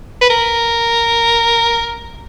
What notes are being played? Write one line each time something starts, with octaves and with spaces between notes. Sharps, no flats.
B4
A#4